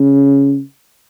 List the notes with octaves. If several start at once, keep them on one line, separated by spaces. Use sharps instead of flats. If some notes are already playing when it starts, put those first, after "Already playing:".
Already playing: C#3